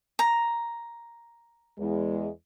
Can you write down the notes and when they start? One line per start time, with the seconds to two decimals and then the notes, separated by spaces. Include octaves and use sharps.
0.19 A#5
1.78 E2 G#3